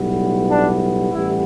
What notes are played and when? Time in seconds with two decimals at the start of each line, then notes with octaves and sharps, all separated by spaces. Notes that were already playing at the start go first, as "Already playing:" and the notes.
Already playing: B1 A2 G3 B3
0.50 D4
1.11 A1 A2 G3 B3 E4